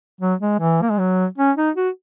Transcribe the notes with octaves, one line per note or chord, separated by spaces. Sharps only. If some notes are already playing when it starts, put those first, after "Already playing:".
F#3
G#3
E3
A#3
G#3
F#3
C#4
D#4
F#4